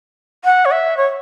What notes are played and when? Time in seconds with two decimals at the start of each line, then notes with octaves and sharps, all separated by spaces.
0.44 F#5
0.65 C#5
0.71 E5
0.97 C#5